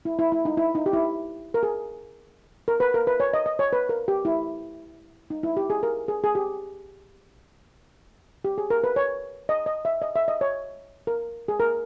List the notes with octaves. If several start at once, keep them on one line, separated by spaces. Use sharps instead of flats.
E4
E4
E4
D#4
E4
D#4
G4
E4
A#4
G#4
A#4
B4
A#4
B4
C#5
D#5
D#5
C#5
B4
A#4
G4
E4
D#4
E4
G4
G#4
A#4
G#4
G#4
G4
G4
G#4
A#4
B4
C#5
D#5
D#5
E5
D#5
E5
D#5
C#5
A#4
G#4
A#4